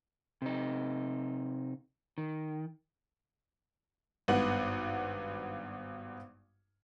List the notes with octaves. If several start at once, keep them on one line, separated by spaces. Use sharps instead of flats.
C3 D#4
D#3
G#1 G2 B3 F#5 F#7